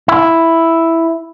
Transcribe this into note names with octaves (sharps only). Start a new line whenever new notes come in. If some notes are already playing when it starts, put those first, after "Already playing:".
E4